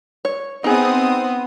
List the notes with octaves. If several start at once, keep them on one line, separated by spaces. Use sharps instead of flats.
C#5
B3 C4 D#4 G#4 D#6